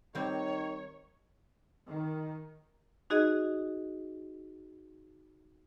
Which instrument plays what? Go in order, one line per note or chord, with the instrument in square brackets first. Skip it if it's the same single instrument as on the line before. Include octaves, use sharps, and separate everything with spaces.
[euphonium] D#3 [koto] G3 C4 [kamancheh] C#5
[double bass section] D#3
[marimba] D#4 F#4 G#4 D#5